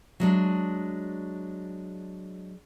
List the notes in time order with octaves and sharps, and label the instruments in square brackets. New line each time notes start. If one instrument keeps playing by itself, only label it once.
[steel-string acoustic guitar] F#3 G#3 D4